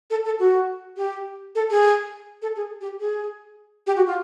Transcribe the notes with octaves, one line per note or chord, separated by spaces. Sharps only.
A4
A4
F#4
G4
A4
G#4
A4
G#4
G4
G#4
G4
F#4
F4